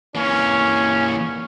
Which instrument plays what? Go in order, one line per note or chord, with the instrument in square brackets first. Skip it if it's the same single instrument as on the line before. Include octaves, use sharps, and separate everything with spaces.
[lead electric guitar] E3 A#3 [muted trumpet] C#4